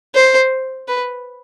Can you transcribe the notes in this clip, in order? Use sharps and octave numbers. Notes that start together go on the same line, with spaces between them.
C5
B4